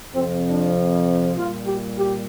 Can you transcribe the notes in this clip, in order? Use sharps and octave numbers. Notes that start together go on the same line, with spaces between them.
F2 C3 F3 C4
D4
A#2 G3 F4
G4
G4